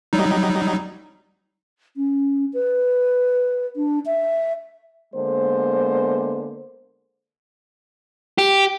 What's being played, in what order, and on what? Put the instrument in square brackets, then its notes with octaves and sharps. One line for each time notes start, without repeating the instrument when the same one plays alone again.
[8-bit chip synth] F#3 G3 D#4
[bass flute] C#4
B4
D4
E5
[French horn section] D3 G#3 A#3 B3 C5
[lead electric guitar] G4